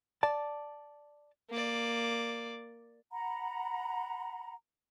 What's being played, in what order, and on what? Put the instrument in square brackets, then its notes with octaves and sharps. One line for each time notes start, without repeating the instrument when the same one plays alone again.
[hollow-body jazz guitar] D5 A5
[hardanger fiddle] A#3 D5
[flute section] F#5 A#5 B5